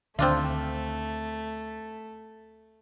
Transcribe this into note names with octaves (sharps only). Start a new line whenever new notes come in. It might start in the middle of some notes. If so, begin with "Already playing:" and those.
D2 D3 D#3 A3 C4 D4 F4